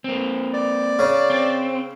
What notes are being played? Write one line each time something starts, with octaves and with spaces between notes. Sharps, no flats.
A#3 C4
D5
C#3
C4